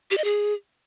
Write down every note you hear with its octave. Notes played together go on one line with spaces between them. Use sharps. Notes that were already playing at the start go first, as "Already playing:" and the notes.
G4
D#5
G#4